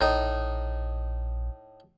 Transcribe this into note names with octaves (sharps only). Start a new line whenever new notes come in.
A#1 A2 D#4